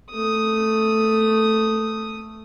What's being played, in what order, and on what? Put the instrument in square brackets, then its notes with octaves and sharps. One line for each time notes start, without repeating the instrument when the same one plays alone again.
[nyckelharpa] A3 D#6